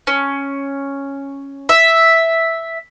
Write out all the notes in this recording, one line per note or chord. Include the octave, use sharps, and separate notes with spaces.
C#4
E5